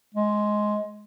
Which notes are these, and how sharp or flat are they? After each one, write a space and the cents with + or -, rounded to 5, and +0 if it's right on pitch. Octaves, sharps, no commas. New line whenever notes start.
G#3 +10